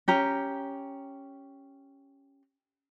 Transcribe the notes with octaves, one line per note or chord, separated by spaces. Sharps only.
C#4 G4 A#5